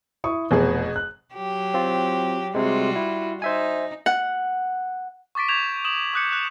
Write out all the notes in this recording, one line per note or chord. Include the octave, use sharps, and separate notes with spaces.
E4 C#6 D#6
F1 B2 G#4
F#6
F#3 G4
C4 F4
C3 G3 G#3 F4 F#4
E4
D#4 C5 E5 G#5
F#5
C#6 D6 A6 B6 D7
C#6 G6 G#6 E7 F7
D#6 E7 F#7
D6 D#6 F#6 G6 C#7
F#6